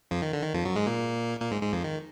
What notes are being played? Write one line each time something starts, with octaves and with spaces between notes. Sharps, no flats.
F2 F3
D#3
D3
D#3
F2 F3
F#2 F#3
G#2 G#3
A#2 A#3
A#2 A#3
G#2 G#3
G#2 G#3
F2 F3
D#3